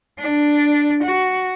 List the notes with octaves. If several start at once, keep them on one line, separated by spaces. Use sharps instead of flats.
D4
F#4